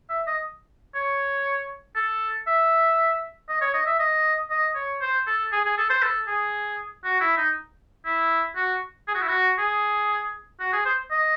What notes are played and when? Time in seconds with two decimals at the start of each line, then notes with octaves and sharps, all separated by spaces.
0.10 E5
0.27 D#5
0.95 C#5
1.95 A4
2.47 E5
3.49 D#5
3.61 C#5
3.74 D#5
3.86 E5
3.99 D#5
4.50 D#5
4.75 C#5
5.01 C5
5.27 A4
5.52 G#4
5.65 G#4
5.77 A4
5.90 C5
6.02 A4
6.27 G#4
7.04 F#4
7.21 E4
7.37 D#4
8.05 E4
8.56 F#4
9.08 G#4
9.15 F#4
9.22 E4
9.28 F#4
9.58 G#4
10.60 F#4
10.73 G#4
10.85 C5
11.11 D#5